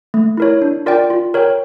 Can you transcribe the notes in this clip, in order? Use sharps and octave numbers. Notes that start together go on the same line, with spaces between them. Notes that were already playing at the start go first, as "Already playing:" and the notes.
A3
E4 A#4 C#5
D4
F4 A#4 D5 G5
F4
A#4 C#5 G5